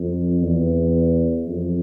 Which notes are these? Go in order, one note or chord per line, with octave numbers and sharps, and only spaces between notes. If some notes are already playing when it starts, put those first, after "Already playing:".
Already playing: F2
E2
F2